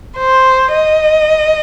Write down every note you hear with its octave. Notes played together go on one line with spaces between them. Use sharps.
C5
D#5